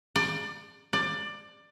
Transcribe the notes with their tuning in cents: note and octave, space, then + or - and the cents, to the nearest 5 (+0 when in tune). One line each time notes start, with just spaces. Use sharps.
D5 +25
D5 +20